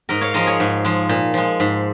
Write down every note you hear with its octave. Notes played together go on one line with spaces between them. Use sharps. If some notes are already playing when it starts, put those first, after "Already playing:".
G#2 A#4 D#5
C#5 F5
F3 G#3 A#4 D#5
G#4 C#5
G#2
F3 G#3
A#2
F3 G#3
G#2